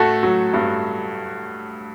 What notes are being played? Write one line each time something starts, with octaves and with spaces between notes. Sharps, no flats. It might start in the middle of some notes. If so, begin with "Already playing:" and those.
Already playing: A2 A3 F#4 A4
F#3
G2